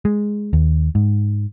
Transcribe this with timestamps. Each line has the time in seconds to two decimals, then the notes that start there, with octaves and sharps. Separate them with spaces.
0.05 G#3
0.53 D#2
0.95 G#2